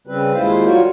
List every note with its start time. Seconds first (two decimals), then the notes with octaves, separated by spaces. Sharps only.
0.07 C#3 G3 C4 B4
0.35 D#2 G#3 E4 F4 C5 F5
0.66 F#3 G3 F4 F#4 A#4 C#5